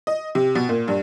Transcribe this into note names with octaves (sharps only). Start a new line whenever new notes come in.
D#5
C3
B2
A#2
G2